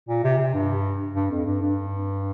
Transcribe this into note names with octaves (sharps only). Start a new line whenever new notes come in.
A#2
C3
C3
G2
G2
F2
G2
G2